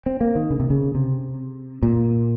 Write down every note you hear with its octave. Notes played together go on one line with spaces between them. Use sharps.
C4
A#3
D#3
C#3
C3
C#3
C3
A#2